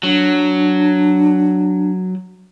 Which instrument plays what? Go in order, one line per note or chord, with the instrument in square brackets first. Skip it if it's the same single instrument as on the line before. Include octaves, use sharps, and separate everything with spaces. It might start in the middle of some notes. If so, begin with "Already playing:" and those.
[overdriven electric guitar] F#3 [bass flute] D4